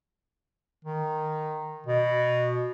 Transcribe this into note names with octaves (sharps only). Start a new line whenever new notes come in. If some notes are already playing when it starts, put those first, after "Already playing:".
D#3
B2